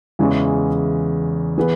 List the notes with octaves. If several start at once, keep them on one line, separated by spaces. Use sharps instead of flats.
E2 C#3 E3 G#3 C#4
E3 B3 G#4 B4